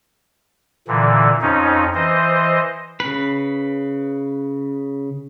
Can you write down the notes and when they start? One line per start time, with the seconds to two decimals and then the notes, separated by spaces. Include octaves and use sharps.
0.88 A#2 D3 E3
1.41 F2 C#4 D#4
1.94 E3 C5 D#5
3.00 C#3 B4